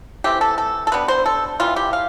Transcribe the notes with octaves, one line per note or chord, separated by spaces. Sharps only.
E3 A3 C4 G4
A4
A4
A4
E3 G3 B3 D4 B4
C5
A4
C3 E3 G3 F4
G4
F5